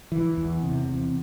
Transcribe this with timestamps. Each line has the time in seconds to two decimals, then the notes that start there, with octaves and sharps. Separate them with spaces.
0.12 E3
0.37 E2
0.63 C3
0.88 E2